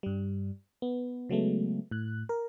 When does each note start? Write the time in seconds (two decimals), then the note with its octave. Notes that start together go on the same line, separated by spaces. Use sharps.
0.03 G2 G3
0.82 B3
1.29 C#3 F#3 G#3 A3 B3
1.91 A2 F#6
2.29 A#4